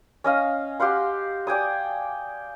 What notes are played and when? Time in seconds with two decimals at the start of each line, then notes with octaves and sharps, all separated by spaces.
0.24 C#4 D#5 F5
0.80 G4 F5 F#5 C6
1.47 D5 G5 G#5 D#6